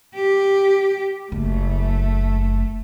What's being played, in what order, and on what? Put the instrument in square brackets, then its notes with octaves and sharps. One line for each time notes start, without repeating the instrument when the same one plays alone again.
[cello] G4
[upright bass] F#1 [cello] A3